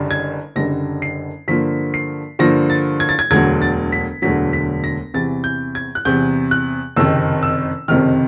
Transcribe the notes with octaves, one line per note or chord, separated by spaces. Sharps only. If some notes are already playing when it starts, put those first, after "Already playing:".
Already playing: F#1 F#2 D3 G3
G#6
F#1 F#2 D3 G3 A#6
C7
G2 D3 F3 A#3 B6
C7
G2 D3 F3 A#3 A#6
A6
G#6
A6
G#6
E1 D2 D3 F#3 G#6
A6
B6
E1 D2 D3 F#3 B6
B6
A#6
E2 C3 E3 A6
G6
G#6
F#6
E2 C3 E3 G6
F#6
F#1 F2 C3 D#3 E6
E6
F#1 F2 C3 D#3 F6